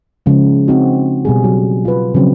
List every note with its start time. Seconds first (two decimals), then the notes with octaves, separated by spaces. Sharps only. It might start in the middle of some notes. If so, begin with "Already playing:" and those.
0.26 C#3 F3 G#3
0.68 C4 C#4 D#4 F#4
1.25 B2 G3 G#4
1.44 F#3
1.85 F4 B4
2.14 C#3 F3 F#3 C4